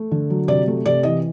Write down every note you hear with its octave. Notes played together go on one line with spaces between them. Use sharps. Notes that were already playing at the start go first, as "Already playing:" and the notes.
Already playing: A3
D3
F#3
C3 D5
A3
C3 D5
E3 D#5